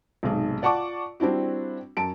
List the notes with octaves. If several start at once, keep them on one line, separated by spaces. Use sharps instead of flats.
B1 G#2 C3 G#3
F4 D5 F#5 A5 C#6 D6
G3 C4 D4 E4 F#4
F#2 A5 D7